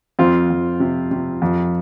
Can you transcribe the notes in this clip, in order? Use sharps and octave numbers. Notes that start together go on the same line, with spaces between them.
F2 C4 F4
F2
C3
C3
F2